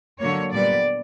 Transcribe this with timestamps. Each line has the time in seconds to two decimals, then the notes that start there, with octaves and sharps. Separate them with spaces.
0.21 D3 F#3 A#3 C#5
0.53 A#2 G3 B3 D5